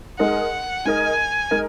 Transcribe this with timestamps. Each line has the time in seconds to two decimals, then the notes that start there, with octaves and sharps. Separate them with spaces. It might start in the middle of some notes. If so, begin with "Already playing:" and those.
0.19 G#3 D#4 A#4 D#5 F#5
0.85 G#3 D#4 A#4 D#5 G#5
1.51 G#3 D#4 A#4 D#5